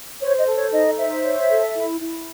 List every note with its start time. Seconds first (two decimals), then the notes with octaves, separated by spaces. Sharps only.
0.20 C5 C#5
0.38 D#5
0.46 A4
0.55 C#5
0.72 D#4 D#5
0.98 C5 E5
1.24 C#5
1.49 A4
1.74 E4
2.00 E4